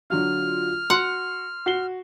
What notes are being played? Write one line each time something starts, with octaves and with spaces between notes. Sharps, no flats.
D3 F#3 F4 F6
F#4 F#5 C6
F#4 C7 G7